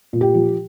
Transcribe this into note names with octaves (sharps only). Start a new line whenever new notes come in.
A#2
G4
F3